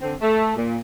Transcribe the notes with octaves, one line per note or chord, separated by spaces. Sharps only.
D3 C4
A3
A#2